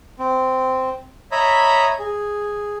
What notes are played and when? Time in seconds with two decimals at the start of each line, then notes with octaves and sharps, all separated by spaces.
0.19 C4
1.32 C#5 D#5 E5 A#5 B5
1.99 G#4